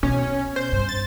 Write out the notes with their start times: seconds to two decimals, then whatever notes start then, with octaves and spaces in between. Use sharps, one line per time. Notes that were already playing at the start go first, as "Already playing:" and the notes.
0.03 B2 C#4
0.56 C5
0.72 G2
0.89 A6